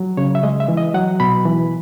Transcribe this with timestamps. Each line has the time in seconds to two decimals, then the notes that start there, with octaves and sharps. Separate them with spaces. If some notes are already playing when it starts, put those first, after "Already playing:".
Already playing: F#3
0.17 C#3 C#5
0.35 E5
0.43 G#3 D#5
0.60 E5
0.68 E3
0.77 D#5
0.94 F#3 F#5
1.20 B2 B5
1.45 E3